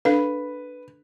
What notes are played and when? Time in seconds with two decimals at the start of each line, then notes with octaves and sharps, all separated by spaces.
0.05 D4 A4 B4 F5